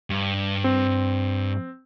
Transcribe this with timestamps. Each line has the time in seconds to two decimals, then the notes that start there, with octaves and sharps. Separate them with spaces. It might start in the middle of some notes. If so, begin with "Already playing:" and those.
0.10 G2
0.64 C4